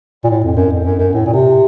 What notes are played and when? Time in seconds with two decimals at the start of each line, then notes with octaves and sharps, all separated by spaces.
0.24 A#2
0.29 A2
0.43 F2
0.56 F#2
0.72 F2
0.85 F#2
0.99 F#2
1.13 A2
1.26 A#2
1.33 C3